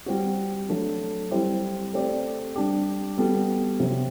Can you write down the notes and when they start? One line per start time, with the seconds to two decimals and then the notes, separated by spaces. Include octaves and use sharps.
0.06 G3 C4 F#4
0.68 F#3 A3 D4
1.31 G3 C4 E4 G4
1.93 A3 C4 G4 D5
2.56 G3 D4 G4
3.17 G3 B3 F#4 A4
3.80 C3 F#3 C4